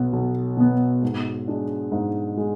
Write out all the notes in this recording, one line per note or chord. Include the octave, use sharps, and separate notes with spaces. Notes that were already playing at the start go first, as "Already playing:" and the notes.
Already playing: B1 B2 B3
B1
B2 B3
G#2
G#3 D4
G#2
G#3